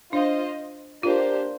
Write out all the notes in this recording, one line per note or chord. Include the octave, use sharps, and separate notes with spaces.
D4 F4 C5 D#5
A#3 D4 F4 G4 C5